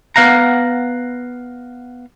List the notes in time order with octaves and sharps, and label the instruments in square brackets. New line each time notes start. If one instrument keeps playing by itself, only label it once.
[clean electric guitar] B3 F5 F#5 A#5